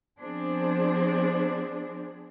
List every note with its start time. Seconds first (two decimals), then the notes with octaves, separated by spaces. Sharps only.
0.19 F3 B3 C4 D4 G#4 C5